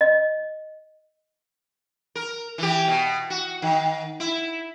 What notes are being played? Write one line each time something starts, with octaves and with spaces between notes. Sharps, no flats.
D#5
A#4
E3 G4
B2
F#4
D#3
E4